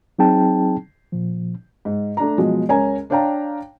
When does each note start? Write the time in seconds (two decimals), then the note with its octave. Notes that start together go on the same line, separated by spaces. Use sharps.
0.19 F#3 C4 D#4 G#4 G5 A5
1.12 A#2 F3
1.85 G#2
2.17 A3 D4 A#5
2.38 B2 F3 F#3 G#3
2.69 C#2 C#4 A#4 G#5 A#5
3.10 D4 C#5 F5 G5 A5 A#5